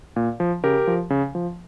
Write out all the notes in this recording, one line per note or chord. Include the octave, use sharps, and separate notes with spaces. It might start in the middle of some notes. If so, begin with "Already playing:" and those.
A#2
F3
C#3 G4 A#4
F3
C#3
F3